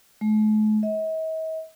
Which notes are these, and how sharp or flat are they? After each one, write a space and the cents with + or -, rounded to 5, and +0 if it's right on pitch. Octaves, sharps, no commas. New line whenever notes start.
A3 -45
D#5 +45